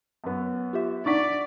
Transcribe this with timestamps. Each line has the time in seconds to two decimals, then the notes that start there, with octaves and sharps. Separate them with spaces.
0.24 F#2 B3
0.73 F4 G4 E5
1.06 D4 D#4 D5 F#5 C#6 A6 B6